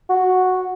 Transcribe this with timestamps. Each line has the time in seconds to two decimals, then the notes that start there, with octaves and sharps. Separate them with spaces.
0.09 F#4